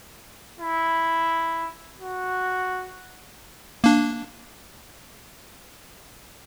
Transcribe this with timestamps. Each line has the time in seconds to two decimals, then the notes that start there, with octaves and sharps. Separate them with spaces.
0.60 E4
1.98 F#4
3.84 A#3 D4